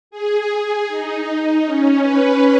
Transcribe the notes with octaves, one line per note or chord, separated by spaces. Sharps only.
G#4
G#4
D#4
D#4
C#4
B4